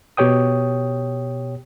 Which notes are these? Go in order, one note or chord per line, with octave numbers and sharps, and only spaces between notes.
B2 G4 C#5 G5 D#6